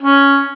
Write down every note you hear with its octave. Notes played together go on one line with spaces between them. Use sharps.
C#4